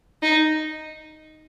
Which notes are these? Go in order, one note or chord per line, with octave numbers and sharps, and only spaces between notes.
D#4